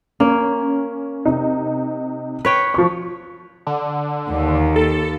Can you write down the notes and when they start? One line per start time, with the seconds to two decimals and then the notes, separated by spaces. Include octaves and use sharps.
0.20 A#3 C#4
1.26 C3 D#4
2.45 B4 C#5 G5
2.74 F3 C#6
3.67 D3
4.29 D#2
4.76 A4